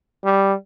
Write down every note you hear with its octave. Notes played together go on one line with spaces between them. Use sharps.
G3